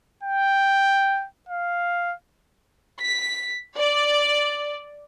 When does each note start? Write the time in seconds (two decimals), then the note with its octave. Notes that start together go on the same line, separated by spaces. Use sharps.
0.23 G5
1.49 F5
3.01 B6
3.76 D5